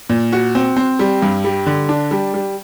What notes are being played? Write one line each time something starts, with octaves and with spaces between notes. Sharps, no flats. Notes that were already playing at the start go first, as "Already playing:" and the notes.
A#2
F#4
C4
C4
G3
G2
G3
D3
D4
G3
G3